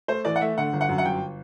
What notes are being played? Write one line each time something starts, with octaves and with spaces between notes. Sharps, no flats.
A3 C5
E3 D5
F#5
A3 E5
D3 F#5
G1
F#5
F#2
F#5
G1 G5